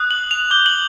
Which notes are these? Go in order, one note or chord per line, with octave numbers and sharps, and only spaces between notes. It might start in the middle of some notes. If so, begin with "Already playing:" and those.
Already playing: D#6 F#6
F#7
F7
D6 G6 G7
F#7